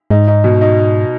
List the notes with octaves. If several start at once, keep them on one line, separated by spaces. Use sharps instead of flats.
G#2 D#4
D#4
B2
D#4